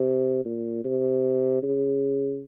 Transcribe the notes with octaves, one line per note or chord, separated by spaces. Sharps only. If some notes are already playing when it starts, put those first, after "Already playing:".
Already playing: C3
A#2
C3
C#3